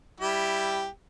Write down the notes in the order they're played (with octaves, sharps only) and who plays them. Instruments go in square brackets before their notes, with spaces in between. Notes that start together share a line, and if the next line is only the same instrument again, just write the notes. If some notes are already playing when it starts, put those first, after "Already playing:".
[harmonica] G3 E4 G4